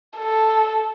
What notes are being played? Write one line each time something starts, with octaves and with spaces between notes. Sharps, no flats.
A4